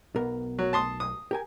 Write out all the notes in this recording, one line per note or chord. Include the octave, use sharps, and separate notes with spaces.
B1 B3 A#4
F#3
A5 C6 D#6
D#6
G4 A#4 G#5